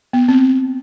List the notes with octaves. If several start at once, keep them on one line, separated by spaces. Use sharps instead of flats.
B3
C4